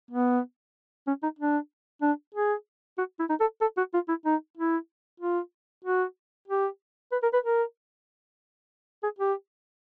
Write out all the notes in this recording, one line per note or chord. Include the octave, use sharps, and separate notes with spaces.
B3
C#4
D#4
D4
D4
G#4
F#4
E4
D#4
A4
A4
F#4
F4
E4
D#4
E4
F4
F#4
G4
B4
A#4
B4
A#4
G#4
G4